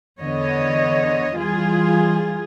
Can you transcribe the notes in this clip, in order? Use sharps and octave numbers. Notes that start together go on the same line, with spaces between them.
E2 D3 B3 C#5 D#5
E3 G3 F4 G#4